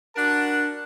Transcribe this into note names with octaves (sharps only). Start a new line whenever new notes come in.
D4 F#4 A#4 F#5 A5